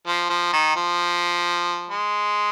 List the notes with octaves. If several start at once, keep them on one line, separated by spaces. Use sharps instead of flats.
F3
F3
D#3
F3
G#3